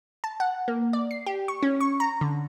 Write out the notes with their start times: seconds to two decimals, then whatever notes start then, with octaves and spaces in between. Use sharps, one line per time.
0.24 A5
0.40 F#5
0.68 A#3
0.93 D5
1.11 C7
1.26 G4
1.48 C#6
1.63 C#4
1.80 C#6
2.00 A#5
2.21 D3